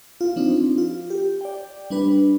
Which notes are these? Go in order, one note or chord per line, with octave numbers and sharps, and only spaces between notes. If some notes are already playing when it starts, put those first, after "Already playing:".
F4
F3 C4 D4 D#4
F4
G4
D5 G5
G3 D4 B4